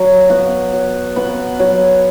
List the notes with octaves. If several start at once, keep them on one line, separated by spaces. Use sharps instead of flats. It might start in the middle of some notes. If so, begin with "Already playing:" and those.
Already playing: F#3
B3 F#4
F#3
B3 F#4
F#3